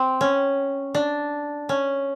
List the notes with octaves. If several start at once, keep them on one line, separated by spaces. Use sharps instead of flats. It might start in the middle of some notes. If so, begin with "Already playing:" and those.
Already playing: C4
C#4
D4
C#4